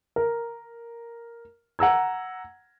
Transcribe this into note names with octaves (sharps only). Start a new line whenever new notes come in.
A#4
F#5 A#5 E6 G#6